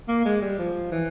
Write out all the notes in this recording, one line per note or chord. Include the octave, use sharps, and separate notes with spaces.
A#3
G#3
G3
F3
E3